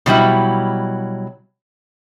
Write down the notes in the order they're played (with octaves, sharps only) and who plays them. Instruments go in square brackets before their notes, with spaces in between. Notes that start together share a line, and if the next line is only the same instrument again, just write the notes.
[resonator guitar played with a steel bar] B2 F#3 G3 E4